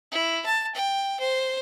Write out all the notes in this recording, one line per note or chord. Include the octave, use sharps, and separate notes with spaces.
E4
A5
G5
C5